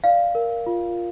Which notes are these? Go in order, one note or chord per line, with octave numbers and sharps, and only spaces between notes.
D5 F5
A#4
F4